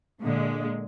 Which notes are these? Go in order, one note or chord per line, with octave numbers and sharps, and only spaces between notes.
A#2 D3 G#3